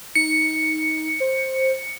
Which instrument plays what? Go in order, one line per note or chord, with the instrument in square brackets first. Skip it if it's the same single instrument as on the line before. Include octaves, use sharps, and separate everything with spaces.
[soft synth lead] D#4 [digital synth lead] C#7
[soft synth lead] C5